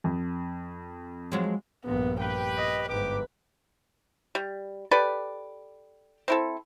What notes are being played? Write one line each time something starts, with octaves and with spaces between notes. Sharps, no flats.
F2
F3 F#3 G#3
A#1 G2 B3
G4 B4 G5
D#5
G1 G#2 G4 B4 D6
G3
G4 A4 B4 D5
C4 E4 A4